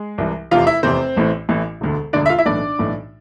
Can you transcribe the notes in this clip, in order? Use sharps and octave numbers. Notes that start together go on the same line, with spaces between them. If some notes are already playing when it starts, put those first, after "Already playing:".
Already playing: G#3 G#4
C2 C3 E3
F1 E2 C3 F4 F5
E4 E5
F1 E2 C3 C4 C5
A1 A2 E3
A1 A2 E3
E1 D2 D3
E1 D2 D3 D4 D5
E5
F4 F5
E4 E5
B1 A2 E3 D4 D5
B1 A2 E3